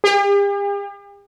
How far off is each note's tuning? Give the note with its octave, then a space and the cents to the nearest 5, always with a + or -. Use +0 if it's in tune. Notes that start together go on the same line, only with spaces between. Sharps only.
G4 +45